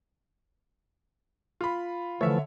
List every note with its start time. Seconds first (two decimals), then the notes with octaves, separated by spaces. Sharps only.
1.61 F4 B5
2.21 D3 E3 F3 A3 C#5 E5